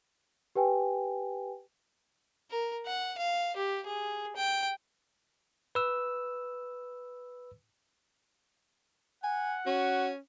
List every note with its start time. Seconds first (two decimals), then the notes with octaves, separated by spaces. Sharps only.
0.55 G4 B4 G5 G#5
2.50 A#4
2.86 F#5
3.18 F5
3.56 G4
3.86 G#4
4.36 G5
5.75 B4 E6
9.24 F#5 G#5
9.66 C#4 F#4